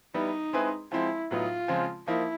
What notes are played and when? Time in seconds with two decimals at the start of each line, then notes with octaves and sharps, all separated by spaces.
0.14 G3 B3 D#4 E4
0.53 G#3 C4 E4 G#4 B4
0.92 F3 G#3 C4 E4
1.31 A2 F#3 B3 D#4 F4
1.68 C#3 F3 G#3 C4
2.07 F3 A#3 D#4 E4